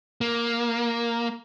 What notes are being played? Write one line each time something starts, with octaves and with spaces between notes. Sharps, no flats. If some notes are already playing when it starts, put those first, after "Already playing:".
A#3